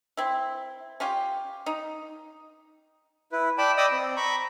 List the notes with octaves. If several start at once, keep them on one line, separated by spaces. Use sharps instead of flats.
C4 E4
C#4 F4 G4
D#4
E4 B4
D5 G5 A5 B5
D5 D#5 G5 B5 D#6 E6
C4
A#5 B5 C#6